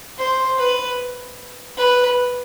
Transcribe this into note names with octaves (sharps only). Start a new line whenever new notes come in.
C5
B4
B4